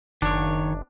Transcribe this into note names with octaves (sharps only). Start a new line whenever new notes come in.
F#1 D#3 D4 C#5